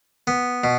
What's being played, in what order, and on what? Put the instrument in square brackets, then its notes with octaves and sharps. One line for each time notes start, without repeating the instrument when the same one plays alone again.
[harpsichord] B3
B2